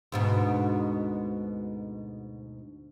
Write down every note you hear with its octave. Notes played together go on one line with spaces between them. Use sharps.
D2 G#2 B2